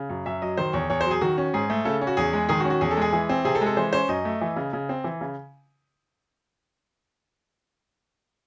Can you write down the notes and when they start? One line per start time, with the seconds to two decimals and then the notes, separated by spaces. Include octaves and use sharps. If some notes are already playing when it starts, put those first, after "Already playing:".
Already playing: C#3
0.09 F#2
0.26 F#2 E5
0.42 F#3 D#5
0.57 D#3 C5
0.73 E2 C#5
0.90 E2 C#5
1.01 C5
1.05 F#3
1.11 G#4
1.21 D#3 F#4
1.38 C#4
1.54 G#2 G#4
1.70 A3
1.85 C#3 A4
2.01 C#4
2.07 F#4
2.17 E2 G#4
2.33 G#3
2.49 D#3 G#4
2.60 F#4
2.65 C#4
2.70 F#4
2.81 E2 G#4
2.91 A4
2.97 G#3 G#4
3.13 E3
3.29 C4
3.45 C3 G#4
3.55 A4
3.61 G#3
3.66 A4
3.77 E3 C5
3.93 C#4 C5
4.09 F#2 D#5
4.25 A3
4.41 E3
4.56 C#3
4.73 C#3
4.89 C4
5.04 E3
5.21 C#3